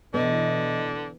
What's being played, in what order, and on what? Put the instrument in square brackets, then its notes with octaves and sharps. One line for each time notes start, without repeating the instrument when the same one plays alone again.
[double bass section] B2 E3 [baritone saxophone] D3 [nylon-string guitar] B3 [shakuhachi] D#5